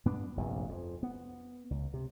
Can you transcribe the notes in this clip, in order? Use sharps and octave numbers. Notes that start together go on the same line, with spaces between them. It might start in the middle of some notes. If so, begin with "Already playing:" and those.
G2 B3 D4
F1 A#1 G2
F2
B3
C#2
C3